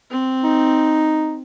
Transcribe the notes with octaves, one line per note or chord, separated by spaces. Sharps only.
C4
D#4